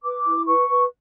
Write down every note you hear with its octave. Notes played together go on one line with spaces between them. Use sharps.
B4 D6
E4
B4 C#6
B4